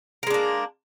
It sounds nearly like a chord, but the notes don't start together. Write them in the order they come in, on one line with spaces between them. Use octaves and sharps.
A#4 G#3 D4 A#3